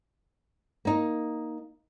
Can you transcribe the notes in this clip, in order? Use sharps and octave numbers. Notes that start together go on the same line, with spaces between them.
A#3 D#4